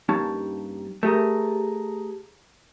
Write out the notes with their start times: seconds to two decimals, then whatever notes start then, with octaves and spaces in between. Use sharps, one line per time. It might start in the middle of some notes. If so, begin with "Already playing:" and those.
0.09 G2 A#3 C#4 D#4 G4 A5
1.03 A3 G4 G#4 A#4